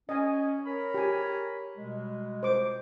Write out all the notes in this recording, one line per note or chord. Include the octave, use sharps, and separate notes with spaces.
C#4 D#5 G#5
A#4 C#5 B5
G4 G#5
B2 G3 G#3
C5 D6